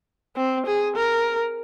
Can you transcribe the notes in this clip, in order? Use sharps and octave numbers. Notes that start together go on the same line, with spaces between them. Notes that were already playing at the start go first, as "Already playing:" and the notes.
C4
G#4
A#4